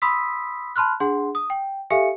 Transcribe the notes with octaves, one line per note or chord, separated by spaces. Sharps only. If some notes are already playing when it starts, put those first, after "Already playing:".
B5 C6 D#6 E6 B6
A5 B5 C6 F6 F#6
D4 G#4 F#5 C6
D#6
G5
G4 A4 E5 F5 G#5 C#7